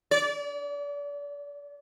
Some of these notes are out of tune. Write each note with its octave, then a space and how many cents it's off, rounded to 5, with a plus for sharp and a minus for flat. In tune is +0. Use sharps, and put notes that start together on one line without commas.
D5 -35